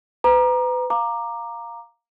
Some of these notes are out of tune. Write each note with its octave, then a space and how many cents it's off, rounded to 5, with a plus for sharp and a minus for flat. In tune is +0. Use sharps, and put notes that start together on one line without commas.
B4 +35 A#5 +20 D6 +45
F5 +0 A#5 +0 D6 +15